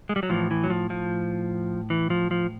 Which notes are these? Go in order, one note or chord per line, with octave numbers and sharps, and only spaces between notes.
G#3
G3
F#3
A2 E3 F3
E3
F#3
F3
F3
E3
F3
F3